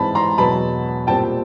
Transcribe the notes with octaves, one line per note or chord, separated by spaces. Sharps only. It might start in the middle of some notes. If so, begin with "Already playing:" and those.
Already playing: G#2 E3 G#3 C4 A5 B5
A#5 C6
E2 B2 F#3 B3 A5 B5
A#2 G3 C4 G5 A5